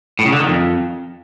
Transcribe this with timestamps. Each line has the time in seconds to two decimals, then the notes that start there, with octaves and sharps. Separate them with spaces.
0.19 A2
0.26 C#3
0.33 D3
0.40 D#3
0.47 F2